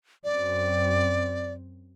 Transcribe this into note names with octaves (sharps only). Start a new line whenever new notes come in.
F#2 C4 D5